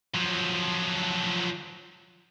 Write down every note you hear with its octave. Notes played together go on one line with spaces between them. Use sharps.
F3 F#3